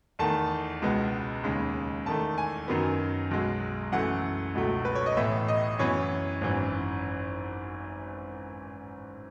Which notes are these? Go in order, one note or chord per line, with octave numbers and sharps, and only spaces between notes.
E2 D#3 A3 A5
C#2 B2 G#3 B3
D#2 C#3 G#3
E2 D#3 A3 A5
G#5
F#2 D#3 F#3 B3
B1 B2 G#3
F#2 E3 A3 F#5
C#2 B2 F#3 A3
B4
C#5
D#5
A1 A2 E3 B3 E5
D#5
F#2 E3 B3 C#5
G#1 F#2 E3